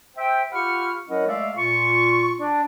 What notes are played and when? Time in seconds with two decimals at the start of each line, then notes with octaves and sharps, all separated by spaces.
0.17 C5 E5 G5
0.52 F4 G4 F#5 B5 C#6 F6
1.08 F#3 C#4 E4 A#4 D#5 F#5
1.27 G#3 A3 A4 D5 E5 F5
1.56 A#2 F4 C#6
2.39 D4